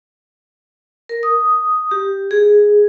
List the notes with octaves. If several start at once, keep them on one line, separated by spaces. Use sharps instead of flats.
A#4
D#6
G4
G#4